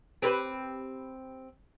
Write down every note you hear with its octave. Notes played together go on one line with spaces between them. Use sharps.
C4 G4 B4